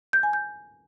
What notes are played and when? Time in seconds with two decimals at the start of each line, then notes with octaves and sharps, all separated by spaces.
0.13 G6
0.23 G#5
0.33 G6